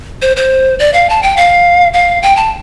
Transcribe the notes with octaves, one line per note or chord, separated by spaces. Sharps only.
C5
C5
D5
F5
A5
G5
F5
F5
G5
A5